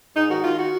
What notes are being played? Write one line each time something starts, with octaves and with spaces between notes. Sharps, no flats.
G#2 D#4
D#3 F#4
D#3 F4
F#4